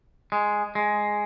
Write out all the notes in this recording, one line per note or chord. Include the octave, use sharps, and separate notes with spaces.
G#3
G#3